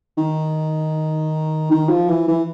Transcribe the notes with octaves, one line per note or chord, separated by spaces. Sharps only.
D#3
D#3
F3
E3
E3